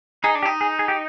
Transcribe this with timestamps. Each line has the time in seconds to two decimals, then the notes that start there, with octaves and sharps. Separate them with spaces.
0.24 D#4 G#4
0.35 D4
0.43 G4
0.45 D#4
0.61 G#4
0.79 G#4
0.88 G4